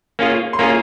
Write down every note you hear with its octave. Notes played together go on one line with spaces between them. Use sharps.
A#3 C#4 F4 G#4
C6
A#3 C#4 F4 G#4 A#5